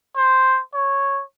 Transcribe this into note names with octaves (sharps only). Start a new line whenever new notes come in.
C5
C#5